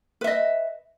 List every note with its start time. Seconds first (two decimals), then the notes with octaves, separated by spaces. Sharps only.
0.21 B4
0.24 E5
0.27 D#5